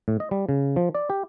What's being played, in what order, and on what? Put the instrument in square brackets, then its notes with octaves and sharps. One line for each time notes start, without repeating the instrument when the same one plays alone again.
[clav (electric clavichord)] A2
D#5
G3
C#3
F3
D5
G4